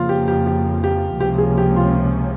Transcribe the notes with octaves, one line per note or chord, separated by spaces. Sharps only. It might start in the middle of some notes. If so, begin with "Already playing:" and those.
Already playing: F2 C#3 F3 A#3 F4
G4
G4
G4
G4
C#2 C3 F3 A#3 C#4 G4
G#4
G4
F4